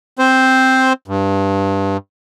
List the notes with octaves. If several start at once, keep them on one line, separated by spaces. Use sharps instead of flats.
C4 C5
G2